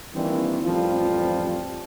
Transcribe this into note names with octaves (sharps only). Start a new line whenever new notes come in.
D#3 E3 G3 A#3 C4 D4
A1 F2 F3 G3 F4